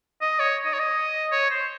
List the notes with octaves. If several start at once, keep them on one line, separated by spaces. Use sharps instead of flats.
D#5
C#5
D#5
C#5
D#5
C#5
C5